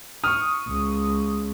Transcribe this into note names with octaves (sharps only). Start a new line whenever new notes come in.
C#6 D#6 F6
C#2